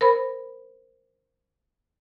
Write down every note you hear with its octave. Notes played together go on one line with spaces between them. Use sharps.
A#4 C5 B5